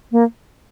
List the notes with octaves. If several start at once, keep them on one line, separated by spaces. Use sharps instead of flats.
A#3